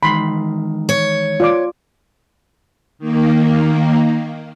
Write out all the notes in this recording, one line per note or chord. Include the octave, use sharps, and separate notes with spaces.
D#3 E3 G#3 B5 C6
C#5
F4 D5 D6
D#3 A#3